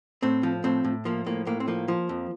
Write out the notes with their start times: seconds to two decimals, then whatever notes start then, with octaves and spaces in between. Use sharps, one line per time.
0.23 A2 C4
0.43 F3
0.64 A2 C4
0.85 A2
1.05 F3 A#3
1.26 A2 A#3
1.46 A2 A#3
1.60 C4
1.68 F3 A#3
1.88 F3
2.09 F2